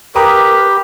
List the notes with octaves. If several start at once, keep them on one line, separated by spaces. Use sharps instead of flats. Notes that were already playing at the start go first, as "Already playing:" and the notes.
G4 A#4 B4 A#5 D6 D#6